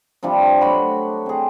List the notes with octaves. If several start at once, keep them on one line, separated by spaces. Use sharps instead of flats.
C3 F3 G3 D4
F#3 A3 F#4 B5
C4 G#4